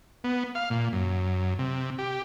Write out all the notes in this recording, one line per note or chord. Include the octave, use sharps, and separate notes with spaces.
B3
F5
A#2
F#2
C3
G4